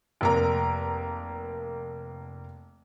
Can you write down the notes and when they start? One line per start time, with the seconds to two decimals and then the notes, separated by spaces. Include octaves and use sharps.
0.21 F1 A#3 A#5